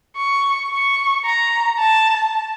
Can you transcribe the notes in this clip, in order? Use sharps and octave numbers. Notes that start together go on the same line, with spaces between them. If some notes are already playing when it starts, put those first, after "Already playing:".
C#6
C#6
A#5
A5